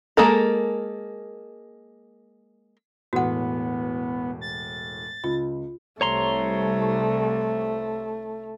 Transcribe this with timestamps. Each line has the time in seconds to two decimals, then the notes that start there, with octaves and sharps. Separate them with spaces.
0.17 G#3 A#3 A4 A#4
3.13 E1 A2 B3 F#4 F#5
4.41 A6
5.24 C#2 F4
6.01 C2 A3 C#5 A#5 C6